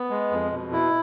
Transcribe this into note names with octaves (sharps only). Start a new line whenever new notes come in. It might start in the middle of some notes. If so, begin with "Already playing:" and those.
Already playing: B3
G#3
F2
B2
E4